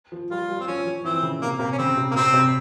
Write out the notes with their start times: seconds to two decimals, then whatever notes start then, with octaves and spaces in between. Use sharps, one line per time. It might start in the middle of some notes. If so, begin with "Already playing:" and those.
0.12 F3
0.30 G3 F4
0.49 G3
0.60 C4
0.68 F3 C#4
0.86 F3
1.04 E3 C4
1.23 C#3
1.41 C3 A#3
1.56 C3 A#3
1.72 C#4
1.78 C#3 C4
1.97 C3
2.11 A#3
2.16 C3 C4
2.34 C3